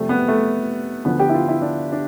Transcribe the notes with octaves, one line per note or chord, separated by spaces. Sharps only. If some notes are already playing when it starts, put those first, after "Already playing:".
Already playing: F2 C3 G3 A3
B3
A3
D2 D3 F3 B3
G4
E4
F4
E4
D4
D4